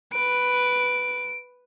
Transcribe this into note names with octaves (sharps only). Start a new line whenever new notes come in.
B4 D7